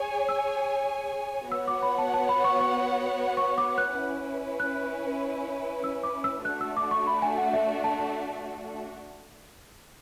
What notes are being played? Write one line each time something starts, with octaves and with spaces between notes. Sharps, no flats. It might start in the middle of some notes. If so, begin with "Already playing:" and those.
Already playing: G#4 C#5 G#5
E6
B3 F#4 C#5 F#5 E6
D6
B5
A5
A5
B5
C#6
C#6
C#6
D6
F#6
C#4 E4 B4
F#6
E6
D6
E6
A3 D4 F#4 F#6
E6
D6
C#6
B5
G#5
F#5
E5
A5
A5